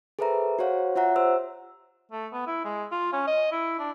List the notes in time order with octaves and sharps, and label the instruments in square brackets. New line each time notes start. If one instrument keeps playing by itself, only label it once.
[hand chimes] G#4 A4 B4 C5 E5 A#5
F#4 C5 C#5 F5 F#5
F4 C#5 E5 F#5 A#5
G4 C5 E6
[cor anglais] A3
B3
E4
G#3
F4
C#4
D#5
E4
D4